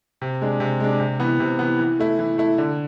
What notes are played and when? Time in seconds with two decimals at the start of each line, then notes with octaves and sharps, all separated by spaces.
0.22 C3
0.42 G#3 D4
0.60 C3
0.80 G#3 D4
1.00 C3
1.20 E3 B3
1.40 C3
1.59 E3 B3
1.79 E3
1.99 A3 E4
2.19 E3
2.38 A3 E4
2.58 D3